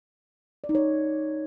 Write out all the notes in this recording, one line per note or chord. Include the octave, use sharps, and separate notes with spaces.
D5
D#4
C#5